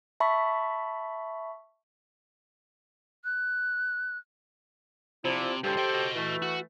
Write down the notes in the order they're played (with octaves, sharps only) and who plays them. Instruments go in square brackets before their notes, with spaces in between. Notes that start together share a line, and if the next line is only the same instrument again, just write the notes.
[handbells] E5 A5 B5 C#6
[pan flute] F#6
[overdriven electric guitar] C3 [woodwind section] F3 E4 D5
[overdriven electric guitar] G2 C#3 [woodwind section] G4 A4 C5
[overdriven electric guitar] D#5 G5
F#4 D#5
[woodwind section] E3 A3
[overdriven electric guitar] F#4